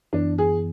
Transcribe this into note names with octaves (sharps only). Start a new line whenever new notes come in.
F#2 E3 B3 D4 E4
G#4